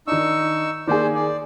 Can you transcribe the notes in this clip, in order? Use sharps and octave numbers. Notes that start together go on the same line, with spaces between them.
D#3 D4 D#4 C#6 E6
D#3 A#3 G#4 C5 D5
D5